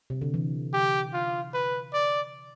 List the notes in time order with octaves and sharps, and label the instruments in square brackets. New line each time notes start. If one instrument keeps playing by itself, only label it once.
[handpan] C3
D3
E3
[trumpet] G4
F4
B4
D5